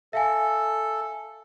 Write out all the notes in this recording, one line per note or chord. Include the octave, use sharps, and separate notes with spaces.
A4 E5 F5 G#5